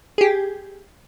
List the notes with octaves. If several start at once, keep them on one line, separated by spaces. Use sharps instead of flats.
G4 G#4